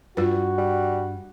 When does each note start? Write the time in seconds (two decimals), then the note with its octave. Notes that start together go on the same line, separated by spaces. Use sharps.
0.17 G2 F4 F#4 B4
0.58 G3